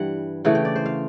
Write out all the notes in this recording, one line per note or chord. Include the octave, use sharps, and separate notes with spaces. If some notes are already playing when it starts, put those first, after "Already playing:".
Already playing: G2 E3 G3 F#5
C#3 E3 A3 F#5
G5
D5
C5
F5